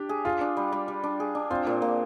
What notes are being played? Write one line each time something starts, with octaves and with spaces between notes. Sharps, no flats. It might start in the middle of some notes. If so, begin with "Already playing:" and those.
Already playing: D4 G4
G#4
F4 G#4
D4
G3
G3
G3
D4
G#4
D4
C4 F4
A#2
A#2